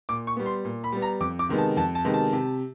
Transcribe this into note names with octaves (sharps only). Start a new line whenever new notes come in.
A#2 D6
C#6
G3 B3
C6
A#2
B5
G3 B3
A#5
F2 D6
D6
C3 D#3 G#3 B3
A5
F2 A5
A5
C3 D#3 G#3 B3
A5
C3